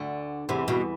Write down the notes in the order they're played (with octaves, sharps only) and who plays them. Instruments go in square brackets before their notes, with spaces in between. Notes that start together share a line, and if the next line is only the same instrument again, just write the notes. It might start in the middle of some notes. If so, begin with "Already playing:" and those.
Already playing: [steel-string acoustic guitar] D2 D3
[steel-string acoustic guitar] E2 E3 [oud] C3
[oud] B2